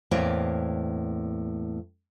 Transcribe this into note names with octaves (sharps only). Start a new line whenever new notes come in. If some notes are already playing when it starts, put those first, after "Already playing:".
E2 A2 A#3 C4 C#5 D5